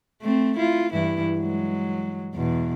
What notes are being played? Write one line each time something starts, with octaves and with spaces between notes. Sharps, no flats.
A3 C4
E4 F4
G2 E3 E4
F#3 G#3
E2 B2